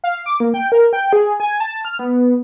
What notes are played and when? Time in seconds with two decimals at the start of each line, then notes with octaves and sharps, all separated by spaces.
0.04 F5
0.26 D6
0.40 A#3
0.54 G5
0.72 A#4
0.93 G5
1.13 G#4
1.40 G#5
1.60 A5
1.85 F6
1.99 B3